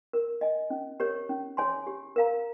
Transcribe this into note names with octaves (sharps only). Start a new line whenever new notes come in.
A#4
D#5 G#5
C#4
G4 A#4 C#5
C#4
G#4 C#5 G#5 C6
G4
A#4 F5 A#5